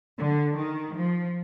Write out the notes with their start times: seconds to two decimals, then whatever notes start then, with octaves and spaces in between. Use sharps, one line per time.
0.17 D3
0.55 D#3
0.94 F3